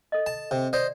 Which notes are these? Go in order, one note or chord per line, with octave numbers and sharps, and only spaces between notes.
A4 D#5
A5
C3
C5 D5 D#5